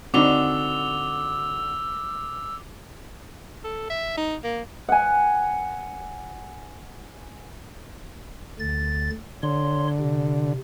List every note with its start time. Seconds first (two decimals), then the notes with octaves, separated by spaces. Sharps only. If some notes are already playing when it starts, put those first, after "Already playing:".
0.14 D3 C4 D#4 F#4 D6 E6 F7 G7
3.64 A4
3.90 E5
4.18 D#4
4.44 A#3
4.89 F#5 G#5
8.59 D2 D3 A6
9.43 D3 C#5 C6
10.00 C3